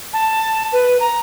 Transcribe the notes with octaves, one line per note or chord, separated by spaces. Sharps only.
A5
B4
A#5